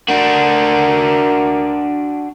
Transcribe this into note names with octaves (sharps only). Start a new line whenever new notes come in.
D4 F#4 A#4